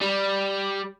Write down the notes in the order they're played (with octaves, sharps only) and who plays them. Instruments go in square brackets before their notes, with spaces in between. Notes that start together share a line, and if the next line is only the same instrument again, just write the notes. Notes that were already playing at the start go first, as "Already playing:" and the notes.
[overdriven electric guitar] G3